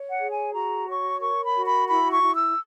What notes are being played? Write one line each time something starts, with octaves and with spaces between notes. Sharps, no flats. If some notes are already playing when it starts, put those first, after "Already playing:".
Already playing: C#5
F#5
G#4
G#5
F#4 A#5
C#5 C#6
A#4 C#6
B5
F#4
B5
E4 B5
C#6
E4
E6